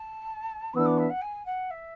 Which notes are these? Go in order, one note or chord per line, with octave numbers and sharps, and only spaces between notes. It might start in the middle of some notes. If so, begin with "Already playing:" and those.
Already playing: A5
E3 B3 D4 E6
D6
E5
F#5
G#5
F#5
E5